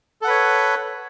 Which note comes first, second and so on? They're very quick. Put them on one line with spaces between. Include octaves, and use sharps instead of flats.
A4 F#5 B4 C#5